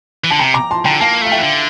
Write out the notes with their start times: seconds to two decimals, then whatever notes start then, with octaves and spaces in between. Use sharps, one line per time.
0.24 E3
0.31 D3 A5
0.39 C3 G5 A#5
0.54 A#5 D6
0.71 A5 C6
0.85 D3 G5 A#5
1.00 A#3 F5 A5
1.21 A3 F5
1.32 E5 G5
1.38 E3
1.43 D3